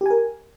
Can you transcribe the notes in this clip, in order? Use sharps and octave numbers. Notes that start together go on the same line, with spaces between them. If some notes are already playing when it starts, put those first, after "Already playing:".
G4 A#4 G#5